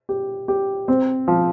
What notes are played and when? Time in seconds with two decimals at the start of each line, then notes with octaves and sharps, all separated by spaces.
0.09 G4
0.48 G4
0.88 C4
1.28 F3